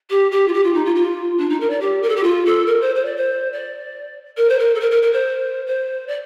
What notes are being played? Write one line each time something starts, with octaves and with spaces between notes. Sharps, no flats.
G4
G4
F4
G4
F4
D#4
F4
F4
D4
D#4
A#4
D5
G4
A#4
A4
G4
F4
A4
A#4
C5
C5
D5
C5
D5
A#4
C5
A#4
A4
A#4
A#4
A#4
C5
C5
D5